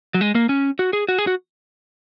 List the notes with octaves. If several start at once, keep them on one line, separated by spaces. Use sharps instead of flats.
F#3
G#3
A#3
C#4
F#4
G#4
F#4
G#4
F#4